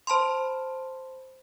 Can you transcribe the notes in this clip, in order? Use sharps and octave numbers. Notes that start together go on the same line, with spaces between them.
C5 A5 B5 C6